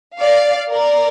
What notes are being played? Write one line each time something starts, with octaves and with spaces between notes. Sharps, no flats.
D5 F5
A#4 D5